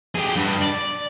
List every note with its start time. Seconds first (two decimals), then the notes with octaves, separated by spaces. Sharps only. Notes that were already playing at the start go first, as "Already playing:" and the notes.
0.15 G4 G#4
0.36 G2
0.61 D5